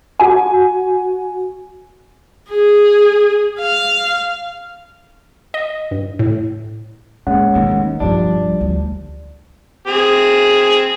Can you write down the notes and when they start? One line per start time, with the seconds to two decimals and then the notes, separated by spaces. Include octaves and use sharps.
0.20 F#4 G#5
2.50 G#4
3.60 F5
5.54 D#5
5.91 G2
6.19 A2
7.27 A#2 G#3 C#4 F#5
7.55 D#2 B2
7.71 D#3
8.00 B1 G2 F3 G3 D4
8.61 D2
9.87 C4 G#4